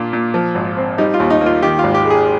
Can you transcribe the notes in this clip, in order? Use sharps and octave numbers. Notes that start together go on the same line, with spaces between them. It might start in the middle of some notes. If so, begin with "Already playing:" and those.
Already playing: A#2 D4 F4
A#2
F3
G#1
C4
G3 D#4
F4
D#2
D#4
A#3
F4
D#3 G4
F4
G#1
G4
G#3
G#4